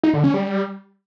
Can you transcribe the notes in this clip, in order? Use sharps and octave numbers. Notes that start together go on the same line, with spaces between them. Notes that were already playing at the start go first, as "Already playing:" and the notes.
D#4
D3
C#4
G3